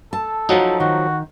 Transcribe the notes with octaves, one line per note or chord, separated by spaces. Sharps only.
A4 A5
F3 F#3 D#4 F#4 C5
D#3 F#4